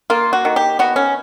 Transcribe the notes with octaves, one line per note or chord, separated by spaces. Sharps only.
A#3 F4
F#4
D#3
G4
B3 F#4
C#4